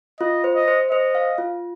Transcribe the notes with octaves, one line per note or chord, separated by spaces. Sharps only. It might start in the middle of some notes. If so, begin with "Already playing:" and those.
F4 D#5
C5
D#5
C5
C5 D#5
F5
F4